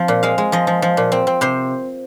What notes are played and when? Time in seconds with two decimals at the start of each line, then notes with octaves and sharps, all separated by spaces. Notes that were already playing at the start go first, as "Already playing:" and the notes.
Already playing: F3 C4
0.08 A#2
0.23 G#3 F5
0.38 G#3
0.52 F3 D#5
0.67 F3
0.82 F3
0.97 A#2
1.12 C4
1.27 C4
1.41 C3 C5